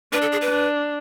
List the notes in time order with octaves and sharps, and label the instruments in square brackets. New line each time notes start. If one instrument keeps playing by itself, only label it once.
[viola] D4 [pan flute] B4
[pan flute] A4
G#4
B4
[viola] D4